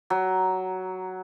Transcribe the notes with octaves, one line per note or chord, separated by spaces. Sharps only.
F#3